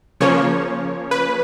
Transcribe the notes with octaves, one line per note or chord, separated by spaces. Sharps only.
C#3 F3 A#3 C#4 C#5
B4